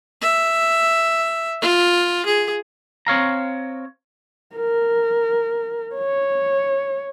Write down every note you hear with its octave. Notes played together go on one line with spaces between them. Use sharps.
E5
F4
G#4
C4 C#5 F5 A#5
A#4
C#5